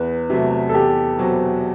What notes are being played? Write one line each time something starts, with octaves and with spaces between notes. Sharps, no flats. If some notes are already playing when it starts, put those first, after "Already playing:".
Already playing: E2 B4
C3 F#3 A3
A4
E2 G4
B2 F#3 C4 F#4